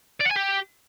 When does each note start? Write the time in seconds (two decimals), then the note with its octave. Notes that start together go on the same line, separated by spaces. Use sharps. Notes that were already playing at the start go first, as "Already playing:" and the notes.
0.21 D5
0.26 F#5
0.31 G#5
0.36 G4